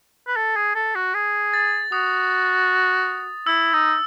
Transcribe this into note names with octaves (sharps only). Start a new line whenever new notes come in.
B4
A4
G#4
A4
F#4
G#4
A6
F#4 D#6
E4 E6
D#4